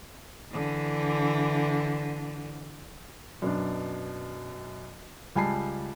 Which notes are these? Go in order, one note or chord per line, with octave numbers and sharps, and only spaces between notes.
D3 E3
F#2 B2 D4
C#2 G3 G#5 A5 B5 C7